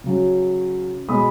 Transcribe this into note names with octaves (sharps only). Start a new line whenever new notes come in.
C#3 F#3
B2 G#3 B5 D#6